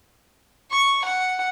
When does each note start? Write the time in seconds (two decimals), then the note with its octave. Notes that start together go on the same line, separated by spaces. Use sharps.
0.71 C#6
1.04 F#5